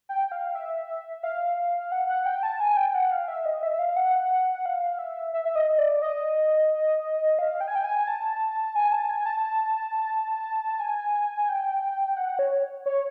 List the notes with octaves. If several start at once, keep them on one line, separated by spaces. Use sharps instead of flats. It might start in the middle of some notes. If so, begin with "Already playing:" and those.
G5
F5
E5
F5
F#5
F#5
G5
A5
G#5
G5
F#5
F5
E5
D#5
E5
F5
F#5
F5
E5
E5
E5
D#5
D5
D#5
F5
G5
G#5
G5
G#5
G#5
A5
G#5
A5
G#5
A5
G#5
G5
F#5
C#5
C#5